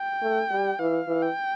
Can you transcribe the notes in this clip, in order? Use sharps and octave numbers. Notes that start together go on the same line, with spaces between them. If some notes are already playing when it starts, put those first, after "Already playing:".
Already playing: G5
A3
G3
E3 F5
E3
G5